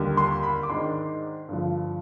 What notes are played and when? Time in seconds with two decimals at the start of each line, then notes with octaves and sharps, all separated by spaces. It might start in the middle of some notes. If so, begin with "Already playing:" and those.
Already playing: D#2 D3 G3
0.17 C6
0.43 B5
0.63 D6
0.69 G#2 D#3 G#3 D4 C6
1.49 G2 D3 F3